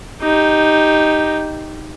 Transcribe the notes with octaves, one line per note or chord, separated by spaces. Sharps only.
D#4 G4